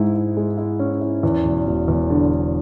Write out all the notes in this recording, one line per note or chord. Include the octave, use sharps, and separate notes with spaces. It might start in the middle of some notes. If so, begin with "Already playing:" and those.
Already playing: G#2 G#3 E4
E4
G#3
E4
C#4
E4
E2
E1
E1
E2
D3
D3